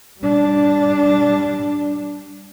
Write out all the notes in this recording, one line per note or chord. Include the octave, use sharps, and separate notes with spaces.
G3 D4